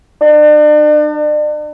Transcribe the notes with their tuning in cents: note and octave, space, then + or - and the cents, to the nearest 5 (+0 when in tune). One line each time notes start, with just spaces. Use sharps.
D4 +40